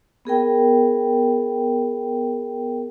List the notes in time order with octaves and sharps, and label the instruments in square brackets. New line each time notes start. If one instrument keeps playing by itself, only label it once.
[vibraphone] B3 G#4 A#4 G5